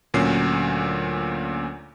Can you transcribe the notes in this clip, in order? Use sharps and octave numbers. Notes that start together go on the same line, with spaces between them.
D2 A#2 F#3 C#4 C7